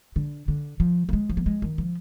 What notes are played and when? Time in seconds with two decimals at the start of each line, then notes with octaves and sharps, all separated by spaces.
0.16 D3
0.48 D3
0.80 F3
1.09 A#3
1.13 G#3
1.30 F3
1.37 A#3
1.46 G#3
1.62 D#3
1.78 F3